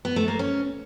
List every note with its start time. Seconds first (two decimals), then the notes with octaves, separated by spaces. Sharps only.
0.05 B3
0.16 A3
0.28 A#3
0.39 C#4